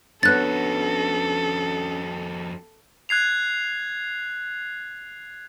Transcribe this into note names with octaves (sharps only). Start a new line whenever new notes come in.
F2 B3 C#4 D4 F#4 A4 F#6 A6
F#6 G#6 C7 F7